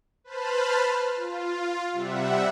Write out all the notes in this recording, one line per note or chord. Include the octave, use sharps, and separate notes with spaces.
B4 C5 A5 B5 F6
F4
C3 G3 E5 F#5